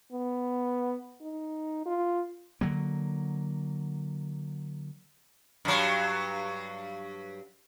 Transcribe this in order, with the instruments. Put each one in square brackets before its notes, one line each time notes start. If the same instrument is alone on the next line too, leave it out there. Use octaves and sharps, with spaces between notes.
[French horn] B3
D#4
F4
[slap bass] D3 F#3 A#3
[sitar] G2 F#3